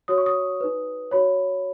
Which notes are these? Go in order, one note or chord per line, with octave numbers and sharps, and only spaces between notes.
F#4 C#5 D#6
C#6
D#6
D#4 B4
F#4 C#5 B5